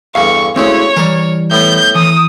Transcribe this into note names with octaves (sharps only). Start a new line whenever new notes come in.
E2 G2 D3 F5 C#6
D2 C#3 G#3 C4 E4 C#5
E3 G3 A#4
A2 B3 G6
E3 D#6